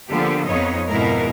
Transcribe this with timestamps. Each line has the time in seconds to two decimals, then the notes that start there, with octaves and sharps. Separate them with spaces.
0.10 D3 F3 A#3 B3 G4
0.45 F2 B3 D#4 C#5 D#5
0.88 F2 G#2 B2 G#3 E4 A#4